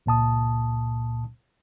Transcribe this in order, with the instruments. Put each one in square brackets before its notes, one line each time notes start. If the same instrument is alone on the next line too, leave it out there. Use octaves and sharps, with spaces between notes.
[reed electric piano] C#2 A#2 A5 D#6